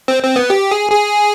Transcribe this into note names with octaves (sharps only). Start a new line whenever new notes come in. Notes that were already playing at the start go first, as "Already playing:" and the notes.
C4
C4
B3
G4
G#4
G#4